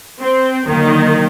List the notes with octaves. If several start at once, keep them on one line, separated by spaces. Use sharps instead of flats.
C4
D3 D#3 F#3 A#3